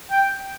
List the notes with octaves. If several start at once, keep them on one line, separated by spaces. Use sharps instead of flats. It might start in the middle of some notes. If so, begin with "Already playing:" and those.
G5